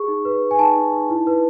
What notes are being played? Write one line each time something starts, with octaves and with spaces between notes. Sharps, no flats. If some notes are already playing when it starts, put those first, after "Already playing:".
Already playing: G#4 C#6
D#4
B4
B4
G#5
D#4 A5
D#4
D#4
E4
B4